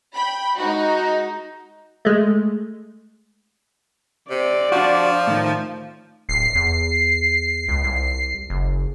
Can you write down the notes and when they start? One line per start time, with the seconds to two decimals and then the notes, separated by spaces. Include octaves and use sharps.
0.16 G5 B5
0.59 G#3 D#4 F#4
2.05 G#3 A3
4.30 C3 D5
4.72 F3 D4 F#4
5.27 A2 D#3
6.29 D1 C7
6.55 E2
7.69 C#2
7.84 C2
8.50 F#1